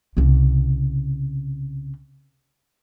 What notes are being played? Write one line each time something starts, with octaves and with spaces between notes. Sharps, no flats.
C2 C#3